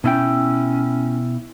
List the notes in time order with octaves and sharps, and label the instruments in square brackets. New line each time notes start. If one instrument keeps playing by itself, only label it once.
[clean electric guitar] B2 E4 G5 [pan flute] C#4